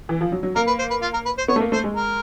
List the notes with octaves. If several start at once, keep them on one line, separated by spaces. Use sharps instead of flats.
E3
F3
F#3
F#3
A#3 A#4
B4
C5
B4
F4
A#4
B4
C5
B3 C#5
A3
A#3
A3 C5
G#3
A#4